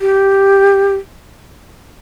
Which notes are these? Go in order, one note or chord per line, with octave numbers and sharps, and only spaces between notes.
G4